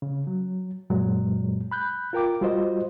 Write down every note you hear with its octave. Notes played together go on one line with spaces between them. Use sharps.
C#3
F#3
F#2 A#2 F#3 G#3
B5 F#6 G6
F4 A#4 G5 D6
G3 F4 F#4 C5 D#5